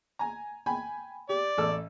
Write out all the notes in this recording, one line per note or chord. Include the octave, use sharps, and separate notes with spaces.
G#5 A#5
G5 G#5 B5
G4 D5
A1 A4 E6